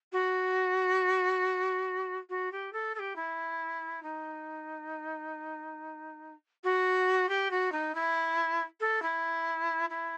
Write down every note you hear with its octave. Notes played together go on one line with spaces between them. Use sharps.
F#4
F#4
G4
A4
A4
G4
E4
D#4
F#4
G4
F#4
D#4
E4
A4
E4
E4